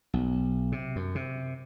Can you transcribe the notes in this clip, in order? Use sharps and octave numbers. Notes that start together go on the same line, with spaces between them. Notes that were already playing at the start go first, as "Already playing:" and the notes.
B1
C3
F#2
C3